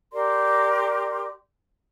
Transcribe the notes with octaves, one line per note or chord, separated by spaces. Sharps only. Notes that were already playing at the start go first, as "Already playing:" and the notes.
G4 A#4 D5 C6